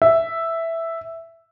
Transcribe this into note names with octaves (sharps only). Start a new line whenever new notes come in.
E5